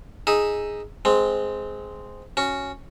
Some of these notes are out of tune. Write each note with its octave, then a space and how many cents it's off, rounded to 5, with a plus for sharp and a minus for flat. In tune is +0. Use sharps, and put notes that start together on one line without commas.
D#4 +0 G#4 +0 E5 +0
G#3 +5 C4 -10
C#4 +0 F#4 +0